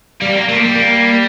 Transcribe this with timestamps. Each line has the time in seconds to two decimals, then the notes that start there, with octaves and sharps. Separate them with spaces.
0.21 G3 A#3
0.29 C4
0.35 A#3
0.49 A3 A#3
0.56 F3
0.62 G3
0.76 A#3